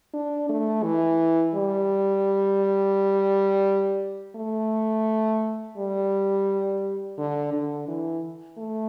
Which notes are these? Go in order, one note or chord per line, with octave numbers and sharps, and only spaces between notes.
D4
A3
E3
G3
A3
G3
D3
D3
E3
A3